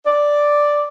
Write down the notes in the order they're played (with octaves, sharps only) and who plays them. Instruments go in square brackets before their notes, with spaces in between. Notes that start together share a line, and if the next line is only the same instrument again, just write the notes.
[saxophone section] D5